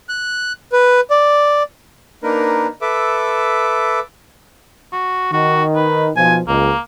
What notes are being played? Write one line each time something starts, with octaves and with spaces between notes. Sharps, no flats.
F#6
B4
D5
A#3 D4 D#4 A#4 B4
A4 B4 E5 D6
F#4
D#3 D#4 F#4
B4
B1 F3 G#5
C#2 A#3